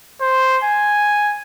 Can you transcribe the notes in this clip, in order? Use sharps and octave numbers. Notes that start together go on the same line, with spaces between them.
C5
G#5